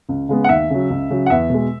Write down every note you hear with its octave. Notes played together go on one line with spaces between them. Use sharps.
C#2
C#3 G#3 B3
F#5
D#2 E5
C#3 F#3
C#2
C#3 F#3
F#5
E2 E5
B2 G#3